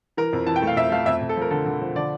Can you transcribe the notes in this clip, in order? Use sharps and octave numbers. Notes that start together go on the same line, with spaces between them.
E3 A#4
F2
E3 A5
G5
A3
F5
F2 E5
A3 F5
F2 E5
F2
A4
F3 A#4
D3 A4
D3
F3
D3 D5